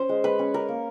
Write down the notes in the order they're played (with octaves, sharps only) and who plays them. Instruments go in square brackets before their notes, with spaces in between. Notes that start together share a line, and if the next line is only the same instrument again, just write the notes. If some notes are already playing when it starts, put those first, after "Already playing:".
Already playing: [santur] C#4 C5
G#3
G#3 B4
C#4
C#4 A#4
A#3